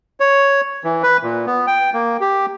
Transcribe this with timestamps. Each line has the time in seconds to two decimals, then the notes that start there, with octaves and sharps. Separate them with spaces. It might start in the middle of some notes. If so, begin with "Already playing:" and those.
0.20 C#5
0.84 E3
1.03 B4
1.23 A#2
1.47 B3
1.67 G5
1.94 A#3
2.20 G4